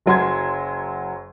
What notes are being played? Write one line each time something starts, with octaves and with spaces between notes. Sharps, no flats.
F#1 F#3 C6 G#6